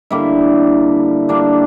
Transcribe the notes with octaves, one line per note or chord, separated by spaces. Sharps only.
D3 G3 A#3 E4
G3 A#3 D4